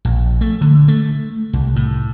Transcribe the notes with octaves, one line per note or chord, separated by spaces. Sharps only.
A#1
A3
D3
A3
C2
A2